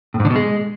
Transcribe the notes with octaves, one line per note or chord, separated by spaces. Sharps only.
A2
G#2
D3
B2
G#3